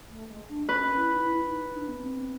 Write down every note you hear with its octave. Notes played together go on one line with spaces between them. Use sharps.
A3
G#3
D4
C#4 B4
E4
D#4
E4
D#4
D4
B3
C4